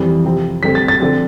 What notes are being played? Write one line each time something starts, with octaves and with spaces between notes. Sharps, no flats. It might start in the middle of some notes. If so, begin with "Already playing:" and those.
Already playing: F2 E3 G3 C4
C3 F3 C4
G2 D3 A3 C4 B6
A6
A6
D3 F3 C4